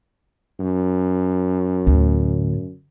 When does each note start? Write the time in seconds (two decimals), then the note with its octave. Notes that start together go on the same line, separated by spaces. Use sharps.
0.60 F#2
1.87 D2 A2